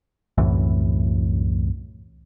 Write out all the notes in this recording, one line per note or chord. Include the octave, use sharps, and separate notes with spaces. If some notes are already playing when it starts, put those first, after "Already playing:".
C2 F#2 A2 E3